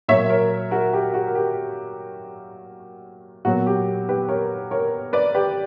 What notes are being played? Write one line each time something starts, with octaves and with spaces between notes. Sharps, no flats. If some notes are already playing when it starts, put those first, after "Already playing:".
A#2 F#3 A#3 C#5 E5
A#4 C#5
F#4 A#4
G4
F#4
A#4
G4
A#2 F#3 B3 F#4
G4
G4 B4
A#4 C#5
A#4 C#5
B4 D5
G4 B4